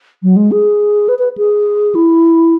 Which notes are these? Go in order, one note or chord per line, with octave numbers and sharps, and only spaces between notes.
F#3
G#3
G#4
B4
B4
G#4
E4